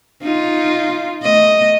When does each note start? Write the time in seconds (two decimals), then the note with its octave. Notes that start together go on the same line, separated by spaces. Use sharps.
0.22 D#4 F4
1.23 A3 D#5